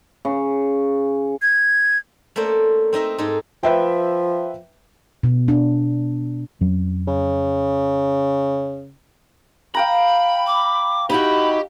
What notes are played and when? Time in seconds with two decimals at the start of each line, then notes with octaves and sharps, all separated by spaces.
0.25 C#3
1.42 G#6
2.36 A3 A#3 C#4 A4 C5 D5
2.93 C4 D#4 D#5 E5
3.18 G#2 D#4 G#4 A4
3.63 F3 B4 E5 G5
5.23 B2
5.48 D4
6.61 F2 F#3 C#4
7.07 C#3
9.75 F5 G5 A#5 B5
10.47 D6
11.10 D#4 E4 F#4 G4 B5